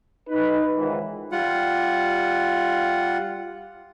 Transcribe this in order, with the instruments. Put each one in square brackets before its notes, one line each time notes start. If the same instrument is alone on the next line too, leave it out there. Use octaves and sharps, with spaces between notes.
[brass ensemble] D#4 B4
C#2 G#2 D#3 E3
[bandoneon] G3 F4 F#5